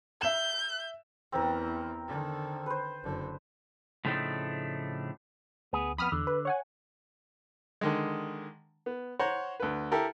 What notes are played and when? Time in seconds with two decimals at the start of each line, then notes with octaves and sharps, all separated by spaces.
0.22 E5 G6 E7
1.32 E2 E3 C4 A#4
2.08 D3 D#3
2.66 B4 C5
3.03 F#1 D3
4.05 A2 C#3 F3 A3 D4 D#4
5.73 D2 B3 G#4
5.98 F2 B3 B5 D#6 F6
6.12 E2 D3
6.27 B4
6.45 C#5 F#5 G#5
7.81 D3 D#3 G#3
8.86 B3
9.19 C5 C#5 F#5 A#5
9.60 D2 B4
9.92 E4 G4 A4 A#4